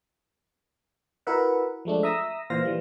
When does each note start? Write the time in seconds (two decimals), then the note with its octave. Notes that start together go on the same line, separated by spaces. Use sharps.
1.27 E4 F#4 A#4 B4 E5 F#5
1.85 F3 G#3 A3 D4
2.03 E5 A#5 D#6 E6 A#6
2.50 A#2 E3 C5 F5 A#6
2.65 E3 G3